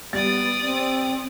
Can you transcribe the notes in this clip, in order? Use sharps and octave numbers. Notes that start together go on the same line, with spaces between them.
G3 B3 D5 D#6 A6
C4